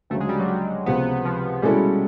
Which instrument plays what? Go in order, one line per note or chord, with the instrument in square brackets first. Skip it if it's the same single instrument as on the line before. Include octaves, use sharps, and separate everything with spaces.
[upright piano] D2 C#3 F#3 [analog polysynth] A3
[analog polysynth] G#3
G3
F#3
G3
[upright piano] C#2 C3 F3 [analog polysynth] B3
[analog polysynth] F3
[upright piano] B2 G#3 C#4 E4 A4 [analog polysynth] G3